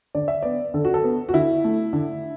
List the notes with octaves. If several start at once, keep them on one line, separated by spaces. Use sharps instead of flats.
D3 D5
E5
B3 D5
D3 A4
F#4
A4
B3
F#4
D3 E4
A3
D3